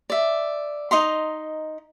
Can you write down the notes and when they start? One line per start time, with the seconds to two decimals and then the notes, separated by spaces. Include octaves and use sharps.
0.10 D5 E5
0.91 D#4 D#5 A#5 C6